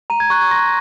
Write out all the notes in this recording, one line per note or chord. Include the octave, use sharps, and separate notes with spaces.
A#5 D#7
G#6
C#6 F#6
G#6
C6 A#6